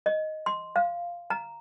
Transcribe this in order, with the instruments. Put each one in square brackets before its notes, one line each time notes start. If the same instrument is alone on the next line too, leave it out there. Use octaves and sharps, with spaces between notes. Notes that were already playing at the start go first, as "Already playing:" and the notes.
[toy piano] D#5
C6
F5
A#5